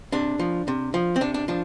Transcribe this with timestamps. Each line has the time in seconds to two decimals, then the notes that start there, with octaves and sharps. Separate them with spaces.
0.12 C3 D4
0.39 F3
0.68 C3
0.94 F3
1.16 C4
1.21 C3 D4
1.34 D4
1.48 F3 D4